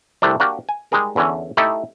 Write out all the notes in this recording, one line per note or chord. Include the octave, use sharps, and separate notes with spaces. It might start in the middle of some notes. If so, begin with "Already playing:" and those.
C2 C3 G3 A3 D4
A#3 D4 F#4 G4 A#4
G#5
G3 G#3 D#4 G#4 A#4
E2 D3 E3 C#4
A3 D#4 E4 G4